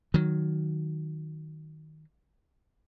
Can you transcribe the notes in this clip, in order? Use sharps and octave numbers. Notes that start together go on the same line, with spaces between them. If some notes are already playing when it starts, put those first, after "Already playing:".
D#3 F#3